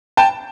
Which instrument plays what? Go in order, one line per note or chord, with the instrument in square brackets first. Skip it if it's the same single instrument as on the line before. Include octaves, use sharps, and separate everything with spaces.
[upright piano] G5 A5